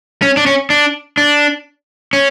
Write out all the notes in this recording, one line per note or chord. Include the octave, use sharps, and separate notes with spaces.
C#4
D4
C#4
D4
D4
C#4